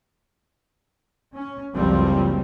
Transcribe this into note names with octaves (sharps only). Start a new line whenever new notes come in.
C#4
F#1 C#2 F3 G3 C4